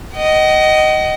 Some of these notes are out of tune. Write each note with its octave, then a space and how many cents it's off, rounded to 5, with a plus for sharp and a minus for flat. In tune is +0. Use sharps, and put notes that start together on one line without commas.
D#5 +0 F#5 +45